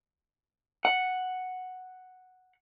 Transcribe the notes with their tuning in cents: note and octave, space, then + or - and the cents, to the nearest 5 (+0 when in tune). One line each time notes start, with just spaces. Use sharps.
F#5 +0